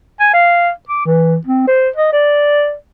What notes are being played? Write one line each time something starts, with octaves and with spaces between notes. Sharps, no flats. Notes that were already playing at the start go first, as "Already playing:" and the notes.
G#5
F5
D6
E3
C4
C5
D#5
D5